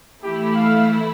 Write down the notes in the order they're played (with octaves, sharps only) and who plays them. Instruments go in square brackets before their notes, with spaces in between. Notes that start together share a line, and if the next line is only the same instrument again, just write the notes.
[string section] E3 A3 E4 [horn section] G4
[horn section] F5